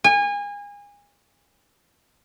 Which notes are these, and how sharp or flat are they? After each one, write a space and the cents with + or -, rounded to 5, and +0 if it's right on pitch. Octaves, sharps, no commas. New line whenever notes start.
G#5 -30